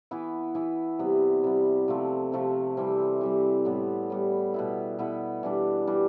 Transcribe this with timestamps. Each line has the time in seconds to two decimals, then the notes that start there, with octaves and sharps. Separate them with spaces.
0.11 E3 B3 E4
0.55 E3 B3 E4
0.99 C3 G3 B3
1.44 C3 G3 B3
1.88 C3 F3 A3 C4
2.32 C3 F3 A3 C4
2.77 E3 G3 C4
3.21 E3 G3 C4
3.65 A2 G3 B3
4.10 A2 G3 B3
4.54 B2 B3 E4
4.99 B2 B3 E4
5.43 E3 G3 D4
5.87 E3 G3 D4